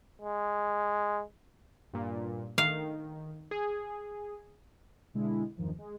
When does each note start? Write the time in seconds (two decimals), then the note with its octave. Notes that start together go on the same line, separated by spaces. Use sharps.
0.22 G#3
1.94 G2 A#2
2.58 D#3 F5
3.51 G#4
5.14 B2 D3 G#3 E4
5.57 E2 G2 D#3 F3
5.78 G#3